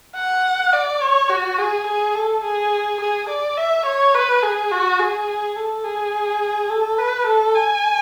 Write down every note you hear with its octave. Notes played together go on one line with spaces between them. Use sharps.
F#5
D5
C#5
F#4
G#4
G#4
A4
G#4
G#4
D5
E5
C#5
B4
G#4
F#4
G#4
A4
G#4
A4
B4
A4
G#5